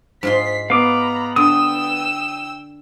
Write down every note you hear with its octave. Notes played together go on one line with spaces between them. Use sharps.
G#2 F4 C6 B6 C7
B3 F5 A#5 B5 D6
D3 G5 D#6 E6